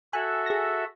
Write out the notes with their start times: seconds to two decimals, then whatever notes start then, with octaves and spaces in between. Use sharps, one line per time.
0.13 F#4 A4 E5 G#5 F#6
0.46 G#4 A#6